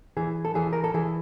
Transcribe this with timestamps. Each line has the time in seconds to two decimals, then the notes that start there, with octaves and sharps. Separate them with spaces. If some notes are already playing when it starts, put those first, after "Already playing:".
0.17 E3 G#4
0.45 A4
0.55 E3 G#4
0.73 A#4
0.84 A4
0.94 E3 G#4